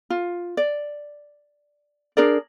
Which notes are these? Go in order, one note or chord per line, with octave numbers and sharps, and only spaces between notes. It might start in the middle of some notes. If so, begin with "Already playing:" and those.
F4
D5
D4 G#4 A#4 D5